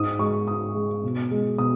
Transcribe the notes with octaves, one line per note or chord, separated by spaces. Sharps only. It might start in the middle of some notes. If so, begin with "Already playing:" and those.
Already playing: G#2 D#6
G#3 C#6
G#2 D#6
G#3
B2
G#3
B2 D#6